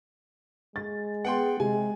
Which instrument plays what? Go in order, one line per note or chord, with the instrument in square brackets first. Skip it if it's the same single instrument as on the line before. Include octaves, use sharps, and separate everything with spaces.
[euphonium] G#3 [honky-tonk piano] A6
[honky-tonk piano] B3 [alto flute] G#4 [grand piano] F#5 G5 C6
[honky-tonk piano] C3 [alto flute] G#3 [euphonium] G#4 [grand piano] G#5